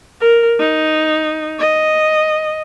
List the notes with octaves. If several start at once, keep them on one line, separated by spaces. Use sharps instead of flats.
A#4
D#4
D#5